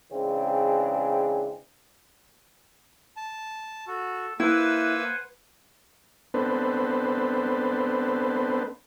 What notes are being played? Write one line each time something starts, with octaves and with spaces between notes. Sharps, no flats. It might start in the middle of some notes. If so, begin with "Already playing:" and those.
C#3 E3 G#3 C4 D4
A5
F#4 A4
A#3 E4 B4 C5 F#5 G#5 E6
B3 C4 D4 A4 B4 C5